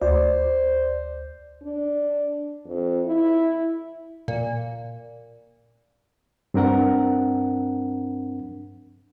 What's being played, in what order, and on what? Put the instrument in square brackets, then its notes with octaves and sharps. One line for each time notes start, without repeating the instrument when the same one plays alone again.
[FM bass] D2 [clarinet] C5 [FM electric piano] D5
[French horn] D4
F2
E4
[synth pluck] A#2
[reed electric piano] G2 C4 D4 A#4 F#5